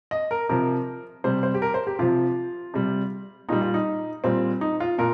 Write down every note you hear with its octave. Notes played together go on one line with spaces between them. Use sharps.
D#5
A#4
C3 F3 A#4
C3 G3 C5
C5
G4
A#4
C5
G4
C3 F3 F4
C3 G3
A#2 G3 D#4
F4
D#4
A#2 G3 C4
D#4
F4
A#2 A#4